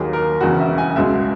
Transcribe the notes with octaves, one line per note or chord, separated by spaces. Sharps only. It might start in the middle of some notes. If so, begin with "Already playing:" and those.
Already playing: D#2 D#3 F#3 A#3 G#4
A#4
E1 E2 C#3 F#4
E5
G#5
C#2 B2 G#3 E5